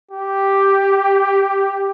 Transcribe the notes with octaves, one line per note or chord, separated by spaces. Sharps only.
G4